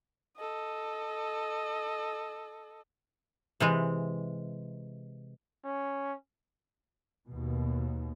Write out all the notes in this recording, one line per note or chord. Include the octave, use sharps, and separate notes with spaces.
A4 D#5
C3 E3 G#3
C#4
D#2 B2